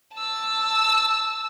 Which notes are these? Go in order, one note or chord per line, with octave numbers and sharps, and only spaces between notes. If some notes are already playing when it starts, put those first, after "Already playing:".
A5 E6